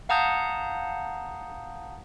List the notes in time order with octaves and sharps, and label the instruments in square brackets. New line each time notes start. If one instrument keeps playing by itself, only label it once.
[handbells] F5 F#5 A5 A#5 D#6 G6